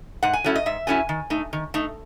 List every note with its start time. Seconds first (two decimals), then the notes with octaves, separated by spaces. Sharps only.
0.23 G#2 F#5
0.33 G#5
0.44 F#3 A3 C#4 E4
0.56 D#5
0.66 G#2 E5
0.87 F#3 A3 C#4 E4 G#5
1.09 D#3
1.30 A3 D#4
1.53 D#3
1.74 A3 D#4